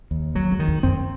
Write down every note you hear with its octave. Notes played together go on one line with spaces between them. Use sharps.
D#2
F2 F#3
E2
D#3
E2
F#2 C4